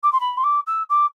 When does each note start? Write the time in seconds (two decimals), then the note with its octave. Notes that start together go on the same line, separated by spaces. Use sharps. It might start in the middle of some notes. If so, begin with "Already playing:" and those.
0.03 D6
0.12 C6
0.20 B5
0.37 C6
0.44 D6
0.66 E6
0.89 D6